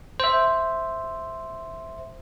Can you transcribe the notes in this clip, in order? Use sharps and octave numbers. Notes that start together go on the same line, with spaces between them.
C5 E5